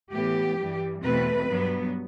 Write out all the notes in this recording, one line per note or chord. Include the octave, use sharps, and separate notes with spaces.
A2 E3 B3 G4
G2 E3 G3
E2 B2 A3 C4 B4
G2 F#3 B3